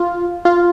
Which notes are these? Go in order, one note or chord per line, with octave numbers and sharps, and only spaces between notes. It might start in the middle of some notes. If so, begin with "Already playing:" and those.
Already playing: F4
F4